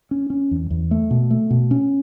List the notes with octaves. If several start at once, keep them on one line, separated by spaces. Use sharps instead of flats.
C#4
C#4
E2
E2
A3
B2
A3
B2
C#4